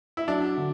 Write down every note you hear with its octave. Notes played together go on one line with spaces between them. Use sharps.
E4
F#3 D4
D3